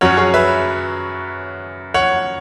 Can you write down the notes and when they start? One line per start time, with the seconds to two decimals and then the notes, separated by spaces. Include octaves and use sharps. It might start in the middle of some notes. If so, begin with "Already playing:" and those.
0.01 F#2 F#3 C#4 C#5 F#5
0.17 G#4 C#5
0.34 B4 E5
1.94 C#5 F#5